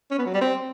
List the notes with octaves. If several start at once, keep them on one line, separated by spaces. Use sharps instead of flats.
C#4
B3
F#3
G3
C4